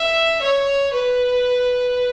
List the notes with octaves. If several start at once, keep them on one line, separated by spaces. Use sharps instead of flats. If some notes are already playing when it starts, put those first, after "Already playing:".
Already playing: E5
C#5
B4